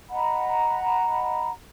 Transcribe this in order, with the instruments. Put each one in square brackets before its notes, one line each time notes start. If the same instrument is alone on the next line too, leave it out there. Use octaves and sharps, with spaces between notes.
[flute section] D#5 F#5 A#5 B5